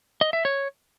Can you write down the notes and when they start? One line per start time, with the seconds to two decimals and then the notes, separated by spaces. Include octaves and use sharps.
0.21 D#5
0.33 E5
0.45 C#5